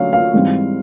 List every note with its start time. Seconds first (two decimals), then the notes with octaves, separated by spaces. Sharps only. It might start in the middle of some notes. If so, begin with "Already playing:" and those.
Already playing: D3 F#3 A3 C#4 F5
0.13 F5
0.34 G#2 E3 G3 C4